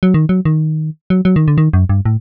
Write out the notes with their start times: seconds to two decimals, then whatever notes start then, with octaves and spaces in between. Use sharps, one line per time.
0.03 F#3
0.14 D#3
0.29 F#3
0.45 D#3
1.10 F#3
1.25 F#3
1.36 D#3
1.48 D3
1.58 D#3
1.73 F#2
1.89 G2
2.05 A2